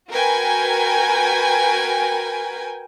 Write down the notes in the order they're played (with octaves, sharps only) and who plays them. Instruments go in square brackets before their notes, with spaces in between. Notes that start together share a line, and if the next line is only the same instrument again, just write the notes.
[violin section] F#4 A#4 B4 G5 G#5